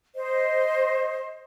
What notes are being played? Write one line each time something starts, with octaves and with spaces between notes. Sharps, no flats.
C5 D#5